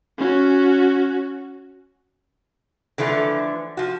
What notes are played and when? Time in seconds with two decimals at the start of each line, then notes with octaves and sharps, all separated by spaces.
0.18 C#4 F#4
2.98 D3 E3 F3 A3
3.77 F3 F#4